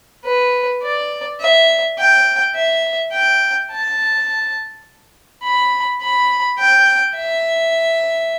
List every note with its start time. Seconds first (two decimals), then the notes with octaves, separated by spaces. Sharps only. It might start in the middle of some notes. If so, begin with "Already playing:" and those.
0.24 B4
0.83 D5
1.40 E5
1.98 G5
2.55 E5
3.12 G5
3.71 A5
5.43 B5
6.02 B5
6.59 G5
7.17 E5